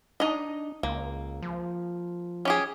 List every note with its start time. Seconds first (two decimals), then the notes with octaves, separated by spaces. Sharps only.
0.20 D4 D#4 D#5
0.83 C#2 A#3
1.43 F3
2.45 C#4 G4 G#4